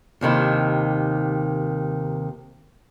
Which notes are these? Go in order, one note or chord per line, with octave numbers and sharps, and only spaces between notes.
D#2 C3 D#3 E4